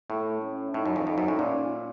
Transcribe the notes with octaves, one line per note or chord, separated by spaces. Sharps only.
A2 A3
C#4
A2 D#4
F#2
F2
F2
F#2
A2
A#2 C#4